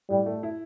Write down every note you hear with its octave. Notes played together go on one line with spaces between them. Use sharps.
A2 G3
A3
E4